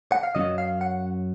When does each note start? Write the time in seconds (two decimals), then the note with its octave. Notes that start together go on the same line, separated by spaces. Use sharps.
0.12 F#5
0.23 F5
0.35 F#2 D#3 F#3 C#4 D#5
0.58 F5
0.81 F#5